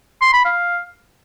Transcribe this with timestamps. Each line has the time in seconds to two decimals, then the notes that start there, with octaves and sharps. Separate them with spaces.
0.21 C6
0.33 B5
0.45 F5